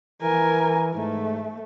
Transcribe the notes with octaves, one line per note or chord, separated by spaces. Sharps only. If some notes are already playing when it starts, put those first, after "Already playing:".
E3 A#4 G#5
G#2 A3